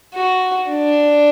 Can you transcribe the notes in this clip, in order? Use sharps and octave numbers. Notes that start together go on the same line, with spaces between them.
F#4
D4